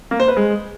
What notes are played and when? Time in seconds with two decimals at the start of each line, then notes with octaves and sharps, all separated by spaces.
0.11 A#3
0.20 C5
0.28 B4
0.37 G#3